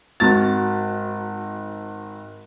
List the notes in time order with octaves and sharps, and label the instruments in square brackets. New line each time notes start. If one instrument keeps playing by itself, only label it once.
[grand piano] G#1 F#4 A6